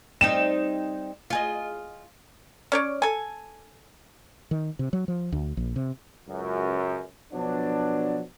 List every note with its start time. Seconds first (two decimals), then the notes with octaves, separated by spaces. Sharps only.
0.21 G3 C4 D#4 E7
1.30 F4 G#4 D#5
2.72 C#4 C#5 D5
3.02 A4 G#5
4.51 D#3
4.79 C3
4.93 F#3
5.08 F3
5.32 D2
5.57 A#1
5.76 C3
6.28 C#2 F#2
7.33 B2 F3 F#3 B3 D4